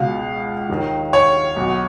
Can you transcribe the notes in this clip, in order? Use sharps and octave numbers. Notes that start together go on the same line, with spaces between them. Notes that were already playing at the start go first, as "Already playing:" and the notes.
Already playing: C#2 B2 F5
D#2 D#3
C#5
B1 B2